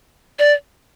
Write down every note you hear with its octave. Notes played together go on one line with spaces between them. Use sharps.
D5